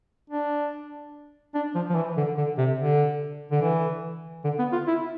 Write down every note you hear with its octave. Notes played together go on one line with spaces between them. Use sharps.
D4
D4
F3
F3
E3
D3
D3
C3
D3
D3
E3
D3
B3
F4
E4